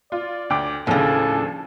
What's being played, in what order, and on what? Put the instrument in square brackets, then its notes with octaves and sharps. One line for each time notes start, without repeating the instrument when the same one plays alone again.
[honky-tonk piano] F4 [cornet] D5
[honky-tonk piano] D2 G5 D6
[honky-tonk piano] D#2 F3 D4 [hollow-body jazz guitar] A2 C#3 [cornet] A4 [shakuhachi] G#5